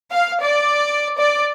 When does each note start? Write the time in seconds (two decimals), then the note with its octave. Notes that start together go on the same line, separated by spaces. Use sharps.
0.11 F5
0.43 D5
1.18 D5